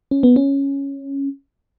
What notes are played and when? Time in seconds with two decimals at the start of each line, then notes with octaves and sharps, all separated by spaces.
0.11 C#4
0.23 B3
0.36 C#4